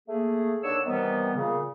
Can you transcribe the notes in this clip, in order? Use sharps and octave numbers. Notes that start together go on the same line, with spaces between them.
A3 A#3 G#4
D#2 D3 D4 C#5 E6
C3 D#3 E3 G3 B3
A#2 C#3